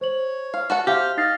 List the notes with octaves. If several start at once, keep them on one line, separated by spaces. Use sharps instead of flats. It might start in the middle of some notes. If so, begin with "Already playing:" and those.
C5 C#5 F#7
F5
F#4 A4 F#5
G4 C5 E5 F5 F6
D#4 D#5 F5 A6 C7